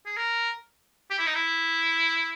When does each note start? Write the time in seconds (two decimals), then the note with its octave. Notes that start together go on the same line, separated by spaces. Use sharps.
0.06 G#4
0.17 A#4
1.11 G4
1.19 E4
1.26 D#4
1.35 E4